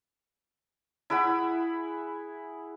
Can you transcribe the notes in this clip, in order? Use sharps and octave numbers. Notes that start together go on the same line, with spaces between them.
E4 G#4 F#5 B5